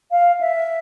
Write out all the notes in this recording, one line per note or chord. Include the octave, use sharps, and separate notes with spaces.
F5
E5